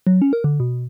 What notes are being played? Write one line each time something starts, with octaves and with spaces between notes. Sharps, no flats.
F#3
C#4
A#4
D3
B2